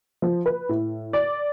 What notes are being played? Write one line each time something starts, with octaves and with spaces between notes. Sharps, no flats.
F3
B4
A2
D5